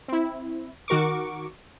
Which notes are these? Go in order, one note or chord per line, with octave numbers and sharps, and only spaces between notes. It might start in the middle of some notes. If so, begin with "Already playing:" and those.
C4 E4
D#3 F#4 A#4 C#6 D6